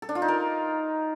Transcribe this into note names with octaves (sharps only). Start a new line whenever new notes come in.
A4
D4
F4
D#4
A#4